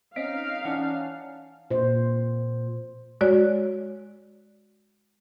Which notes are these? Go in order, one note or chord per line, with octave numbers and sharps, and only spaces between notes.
C4 C#4 D#4 D#5 F5 B6 D7
E3 C#4 D5 F#5 A5
A#2 C5
G#3 F#4 C#5 D5